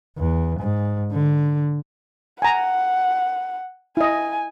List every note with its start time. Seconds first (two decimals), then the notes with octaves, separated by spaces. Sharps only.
0.18 E2
0.60 G#2
1.12 D3
2.42 F#5 G#5 A#5
3.97 E4 D#5 G#5